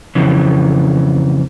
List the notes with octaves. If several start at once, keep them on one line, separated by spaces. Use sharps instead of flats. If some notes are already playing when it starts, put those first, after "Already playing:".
F2 C#3 E3